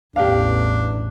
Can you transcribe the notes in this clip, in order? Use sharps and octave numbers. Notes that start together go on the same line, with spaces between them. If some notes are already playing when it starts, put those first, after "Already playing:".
A1 E2 D4 G4 F5